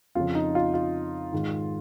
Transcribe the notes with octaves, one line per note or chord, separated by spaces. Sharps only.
F2 C#3 F4
D#4
F4
F4
G#2 D#3